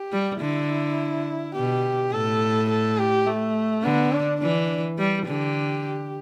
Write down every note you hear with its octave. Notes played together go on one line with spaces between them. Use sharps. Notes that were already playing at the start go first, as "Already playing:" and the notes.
Already playing: G4
G3
D3 E4
B2 G4
A2 A4
A4
G4
A3
D3 B3
D4
E3 D4
G3
D3 G4